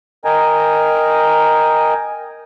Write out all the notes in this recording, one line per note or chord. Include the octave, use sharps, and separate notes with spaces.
A#4 D#5 G5 G#5 A#5